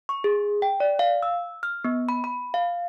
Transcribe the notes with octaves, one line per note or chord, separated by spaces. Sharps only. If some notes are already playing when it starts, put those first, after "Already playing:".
C#6
G#4
G5
D5
F5
E6
F6
B3
B5
B5
F5